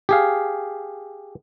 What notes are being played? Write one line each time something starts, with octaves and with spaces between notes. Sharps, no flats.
G4 G#4 F5